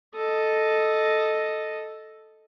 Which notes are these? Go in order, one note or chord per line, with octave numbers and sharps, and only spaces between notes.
A4 D#5